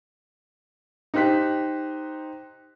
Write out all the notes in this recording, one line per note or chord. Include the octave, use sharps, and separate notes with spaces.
D#4 G4 C5 F#6 B6